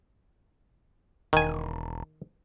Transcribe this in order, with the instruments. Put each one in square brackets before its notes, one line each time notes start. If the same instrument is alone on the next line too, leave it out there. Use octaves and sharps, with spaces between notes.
[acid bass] E1 [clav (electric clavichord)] D#3 G#5